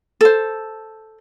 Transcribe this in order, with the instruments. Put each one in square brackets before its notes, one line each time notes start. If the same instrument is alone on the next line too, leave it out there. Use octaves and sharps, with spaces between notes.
[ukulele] A4 C5